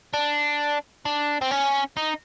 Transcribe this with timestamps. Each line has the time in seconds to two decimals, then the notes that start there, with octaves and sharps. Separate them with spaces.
0.13 D4
1.05 D4
1.42 C4
1.51 C#4
1.97 D#4